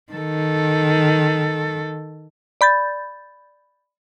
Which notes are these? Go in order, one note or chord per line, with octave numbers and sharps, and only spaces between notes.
D#3 A4
D5 B5 G6 A6